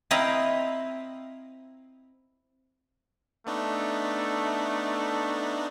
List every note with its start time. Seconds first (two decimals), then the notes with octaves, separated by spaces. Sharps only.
0.11 C4 E4 D#5 F5 A#5 B5
3.47 A3 B3 D4 D#4